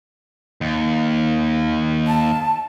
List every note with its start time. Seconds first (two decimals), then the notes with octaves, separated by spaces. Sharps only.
0.61 D#2
2.07 A5